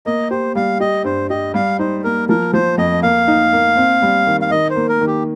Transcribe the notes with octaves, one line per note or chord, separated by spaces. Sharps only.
A#3 D#5
G4 C5
G3 F5
G4 D#5
G2 C5
G4 D#5
G3 F5
D#4 C5
A#3 A#4
F3 A#4
F3 C5
F2 D#5
A#3 F5
D#4
A#3
C4
G3
D#3
F5
D#3 D#5
C5
A#3
A#4
D#3
G4